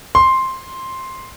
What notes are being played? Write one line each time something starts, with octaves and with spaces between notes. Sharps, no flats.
C6